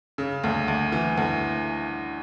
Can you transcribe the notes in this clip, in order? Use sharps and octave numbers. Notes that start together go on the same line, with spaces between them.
C#3
D2
D2
E3
D2